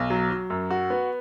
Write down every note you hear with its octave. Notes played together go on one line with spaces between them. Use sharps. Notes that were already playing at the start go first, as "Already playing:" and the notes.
Already playing: B1
F#3
F#3
F#2
F#4
B3